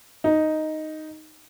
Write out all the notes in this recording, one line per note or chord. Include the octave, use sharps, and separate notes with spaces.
D#4